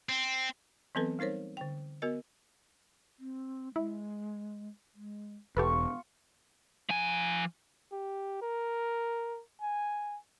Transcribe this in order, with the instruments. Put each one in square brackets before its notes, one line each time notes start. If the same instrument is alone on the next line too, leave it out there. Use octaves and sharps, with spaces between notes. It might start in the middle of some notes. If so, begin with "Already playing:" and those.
[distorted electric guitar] C4
[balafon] E3 F#3 B3 C4 A4 B4
G3 D#4 A#4 C5 C#5
D3 G5
B3 F#4 A#4 D#5
[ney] C4
[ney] G#3 [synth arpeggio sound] E4
[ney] G#3
[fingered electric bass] E1 [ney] B3 [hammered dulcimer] F4 C#6 [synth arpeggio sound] G4 A4 B4
[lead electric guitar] F3 G#5
[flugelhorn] G4
A#4
G#5